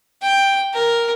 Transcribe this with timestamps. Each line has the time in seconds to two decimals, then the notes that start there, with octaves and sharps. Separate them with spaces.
0.22 G5
0.74 A#4